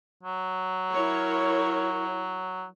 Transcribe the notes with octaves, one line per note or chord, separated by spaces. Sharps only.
F#3
E4 A#4 C#5